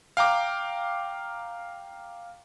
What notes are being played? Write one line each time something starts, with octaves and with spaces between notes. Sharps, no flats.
F5 G5 A#5 D6